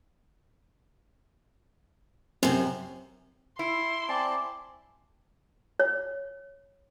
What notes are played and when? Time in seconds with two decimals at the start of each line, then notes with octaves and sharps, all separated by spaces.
2.43 F#2 C3 C4
3.59 E4 C6
4.09 C4 D5 G#5 A5 D6
5.80 C#5